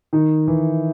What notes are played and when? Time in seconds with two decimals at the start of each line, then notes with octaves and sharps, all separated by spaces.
0.13 D#3 D#4
0.47 E3 E4